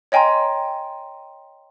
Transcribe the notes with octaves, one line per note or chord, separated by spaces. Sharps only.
C#5 D#5 G5 G#5 A#5 C6